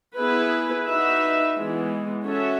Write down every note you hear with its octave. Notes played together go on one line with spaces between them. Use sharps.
B3 E4 G#4 B4
D#4 F#4 B4 E5
E3 G#3 B3
C#4 F#4 A4 C#5 E5